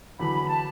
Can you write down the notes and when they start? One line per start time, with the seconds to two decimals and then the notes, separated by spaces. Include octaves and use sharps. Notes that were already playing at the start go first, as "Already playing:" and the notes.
0.20 E2 D3 F#3 B5
0.34 B5
0.45 B5
0.50 A5